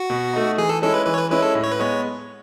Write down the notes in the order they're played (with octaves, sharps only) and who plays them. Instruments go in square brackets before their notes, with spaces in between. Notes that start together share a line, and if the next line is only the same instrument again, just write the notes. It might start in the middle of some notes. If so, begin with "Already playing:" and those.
Already playing: [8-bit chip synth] F#4
[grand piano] B2
A3 D#4
[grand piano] E3 [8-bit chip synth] G#4
[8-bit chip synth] A4
[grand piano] G#3 C#4 E4 [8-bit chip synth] A4
[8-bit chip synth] B4
[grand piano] E3 [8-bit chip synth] B4
[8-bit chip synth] C#5
B4
[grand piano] G#3 C#4 E4 [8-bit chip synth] B4
[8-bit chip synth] A4
[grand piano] A2
[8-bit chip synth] C#5
B4
[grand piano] G#3 B3 [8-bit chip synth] C#5